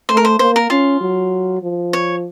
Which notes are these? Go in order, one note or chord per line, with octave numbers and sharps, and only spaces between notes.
A3 C5
A#4
C5
A#3 C5
A#4
C#4 F4
F#3
F3
C#5